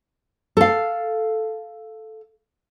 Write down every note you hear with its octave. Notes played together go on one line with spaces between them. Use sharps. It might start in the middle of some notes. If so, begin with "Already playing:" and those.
A4 F5